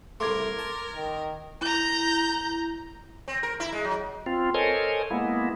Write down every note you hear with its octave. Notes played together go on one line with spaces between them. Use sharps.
C2 A3 A#4 C6 D6 G#6
A5
D#3
E4 A#5 G6
C4
A#4
E4
G#3
F#3
C4 F4
A4 A#4 C5 C#5 D#5 G#5
G#3 A#3 B3 E4